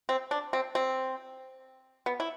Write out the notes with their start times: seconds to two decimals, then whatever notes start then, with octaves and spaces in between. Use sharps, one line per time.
0.09 C4
0.31 D4
0.53 C4
0.75 C4
2.06 B3
2.20 E4